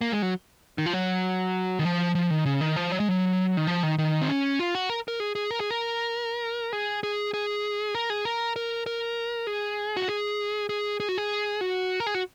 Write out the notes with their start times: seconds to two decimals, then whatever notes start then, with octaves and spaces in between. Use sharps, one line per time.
0.01 A#3
0.12 G#3
0.22 F#3
0.78 D#3
0.86 F3
0.93 F#3
1.79 D#3
1.85 F3
2.15 F3
2.30 D#3
2.46 C#3
2.61 D#3
2.76 F3
2.92 F#3
3.00 G#3
3.08 F#3
3.57 D#3
3.67 F3
3.83 D#3
3.98 D#3
4.22 C4
4.29 C#4
4.59 F4
4.75 F#4
4.90 A#4
5.08 A#4
5.20 G#4
5.35 G#4
5.51 A#4
5.60 G#4
5.70 A#4
6.73 G#4
7.03 G#4
7.34 G#4
7.95 A#4
8.10 G#4
8.25 A#4
8.56 A#4
8.86 A#4
9.47 G#4
9.97 F#4
10.08 G#4
10.69 G#4
11.00 G#4
11.09 F#4
11.17 G#4
11.61 F#4
12.00 A#4
12.06 G#4
12.14 F#4